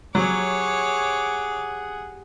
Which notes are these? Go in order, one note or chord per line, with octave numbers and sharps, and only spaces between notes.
F#3 G4 G#4 C#5 F#5 D6